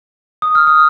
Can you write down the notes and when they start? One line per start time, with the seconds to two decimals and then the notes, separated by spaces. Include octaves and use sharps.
0.42 D#6
0.55 F6
0.67 D#6